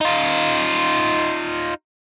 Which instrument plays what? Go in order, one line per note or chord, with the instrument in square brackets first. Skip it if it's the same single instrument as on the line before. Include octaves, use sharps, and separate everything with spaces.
[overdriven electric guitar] D#4 F4